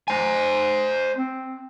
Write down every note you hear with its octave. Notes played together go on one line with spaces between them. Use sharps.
C5 G#5
C4